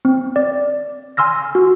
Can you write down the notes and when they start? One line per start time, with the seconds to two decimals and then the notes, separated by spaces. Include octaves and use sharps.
0.05 C4
0.36 D5
1.17 G#5 C6 E6 F6 A#6
1.55 F#4